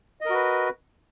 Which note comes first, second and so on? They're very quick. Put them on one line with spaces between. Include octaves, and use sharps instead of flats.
D#5 A#4 F#4 B4